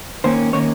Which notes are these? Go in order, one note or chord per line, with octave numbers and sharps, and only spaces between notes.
D#3 A#3 C#4 C5
D#3 A#3 C#4 C#5